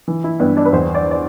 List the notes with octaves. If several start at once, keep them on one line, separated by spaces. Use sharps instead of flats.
E3
E4
G2 B3
D4
B4
E2 C5
D5
D5